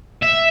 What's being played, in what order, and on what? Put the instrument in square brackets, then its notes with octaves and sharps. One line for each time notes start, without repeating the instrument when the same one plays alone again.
[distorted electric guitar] E5